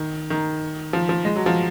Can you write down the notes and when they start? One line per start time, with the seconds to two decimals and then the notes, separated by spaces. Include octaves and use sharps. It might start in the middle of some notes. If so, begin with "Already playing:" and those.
Already playing: D#3
0.30 D#3
0.93 F3
1.09 F3
1.25 G#3
1.36 F#3
1.46 F3